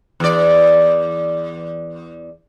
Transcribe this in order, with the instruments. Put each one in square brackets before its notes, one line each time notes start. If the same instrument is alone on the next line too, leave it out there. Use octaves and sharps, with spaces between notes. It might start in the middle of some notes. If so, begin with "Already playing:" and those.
[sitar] E2 D5